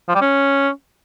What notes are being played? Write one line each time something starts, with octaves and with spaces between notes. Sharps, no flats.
F3
G3
C#4